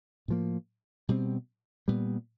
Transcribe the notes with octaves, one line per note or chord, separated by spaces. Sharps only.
A2 F3 A#3
B2 G3 C4
A#2 G3 B3